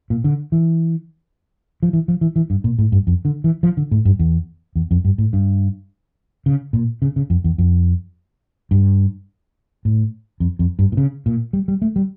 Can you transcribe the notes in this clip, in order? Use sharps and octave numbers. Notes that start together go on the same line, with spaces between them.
A#2
D3
E3
F3
E3
F3
E3
E3
G2
A#2
A2
G2
F2
D3
E3
F3
D3
A2
G2
E2
E2
F2
G2
A2
G2
C#3
A#2
C#3
C#3
F2
E2
F2
G2
A2
F2
F2
G2
A#2
C#3
A#2
G3
G3
A3
G3